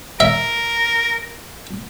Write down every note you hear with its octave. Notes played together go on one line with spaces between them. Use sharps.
A#4 E5